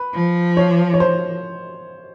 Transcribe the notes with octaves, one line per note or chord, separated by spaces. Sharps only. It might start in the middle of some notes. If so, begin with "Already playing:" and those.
Already playing: B4
F3
C#5
C#5
C5